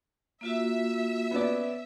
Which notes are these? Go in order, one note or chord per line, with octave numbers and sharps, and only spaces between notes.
A#3 F4 F#4 E5
B3 C#4 D5